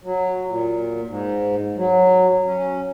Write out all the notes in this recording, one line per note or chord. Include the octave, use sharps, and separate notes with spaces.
F#3
A#2
G#2
F#3
C#4